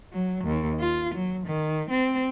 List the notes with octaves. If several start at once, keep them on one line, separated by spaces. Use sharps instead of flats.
F#3
D#2
F4
F#3
D#3
C4